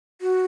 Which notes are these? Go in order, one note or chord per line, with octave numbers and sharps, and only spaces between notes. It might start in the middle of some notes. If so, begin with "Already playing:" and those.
F#4